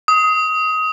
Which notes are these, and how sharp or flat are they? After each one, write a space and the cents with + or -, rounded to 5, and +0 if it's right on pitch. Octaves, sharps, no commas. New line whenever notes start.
D#6 +20